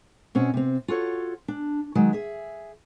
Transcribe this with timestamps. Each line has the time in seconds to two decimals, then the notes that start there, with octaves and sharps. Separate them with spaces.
0.35 B2 C4 C#4
0.54 C3 C4
0.88 F4 F#4 A4 C#5
1.48 D4
1.95 D#3 F#3 G#3
2.13 G#4 E5